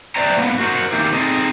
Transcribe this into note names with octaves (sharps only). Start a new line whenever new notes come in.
B4 C5 D5 E5 G5 A#5
G#2 A#3 B3
F#4 A#4 C5 F#5
D#3 A#3 E4 G4
C4 D#4 G#4 A4 D#5